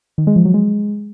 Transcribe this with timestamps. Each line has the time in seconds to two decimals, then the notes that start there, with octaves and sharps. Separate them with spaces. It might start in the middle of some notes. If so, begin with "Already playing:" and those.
0.18 D#3
0.27 G#3
0.36 F3
0.45 F#3
0.54 G#3